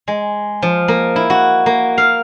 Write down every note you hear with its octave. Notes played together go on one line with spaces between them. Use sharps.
G#3
F3
A#3
E4
F#4
A#3
F5